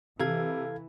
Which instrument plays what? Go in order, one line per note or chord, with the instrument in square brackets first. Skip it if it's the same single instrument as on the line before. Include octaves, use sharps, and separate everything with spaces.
[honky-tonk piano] C3 [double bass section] E3 [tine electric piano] A4 F5 G#6